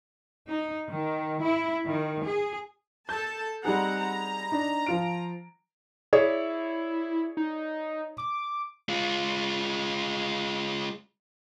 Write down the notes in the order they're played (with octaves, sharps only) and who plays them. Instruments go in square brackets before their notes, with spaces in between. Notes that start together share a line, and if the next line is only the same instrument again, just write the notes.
[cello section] D#4
D#3
E4
D#3
G#4
[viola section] A4 A5 [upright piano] G6
[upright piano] G3 D#4 G#4 [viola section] C4 F#5 A#5
[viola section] A#5
[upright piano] D4 D#4
F3 F4 D7
[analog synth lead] E4 [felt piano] G#4 C#5 D5
[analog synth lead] D#4
D6
[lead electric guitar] G#3 F4